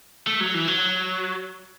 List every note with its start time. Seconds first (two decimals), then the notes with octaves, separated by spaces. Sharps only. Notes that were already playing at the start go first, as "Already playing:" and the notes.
0.27 A3
0.40 F#3
0.54 E3
0.68 F#3